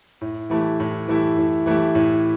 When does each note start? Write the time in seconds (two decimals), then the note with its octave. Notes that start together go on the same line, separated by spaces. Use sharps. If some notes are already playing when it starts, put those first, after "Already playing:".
0.21 A2
0.50 E3 A3 E4 G4
0.80 A2
1.08 E3 A3 E4 G4
1.38 A2
1.66 E3 A3 E4 G4
1.95 A2